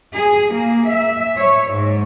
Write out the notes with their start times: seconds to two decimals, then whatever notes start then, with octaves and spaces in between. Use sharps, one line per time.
0.15 G#4
0.53 A#3
0.88 E5
1.38 C#5
1.70 G#2